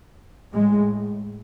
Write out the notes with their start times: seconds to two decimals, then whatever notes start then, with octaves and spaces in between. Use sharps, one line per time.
0.53 A2 G#3